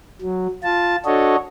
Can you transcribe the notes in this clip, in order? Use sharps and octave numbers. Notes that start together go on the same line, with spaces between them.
F#3
F4 A5
D4 F#4 A4 C#5 D#5